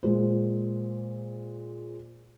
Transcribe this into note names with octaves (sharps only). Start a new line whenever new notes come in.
A#2 G#3 C5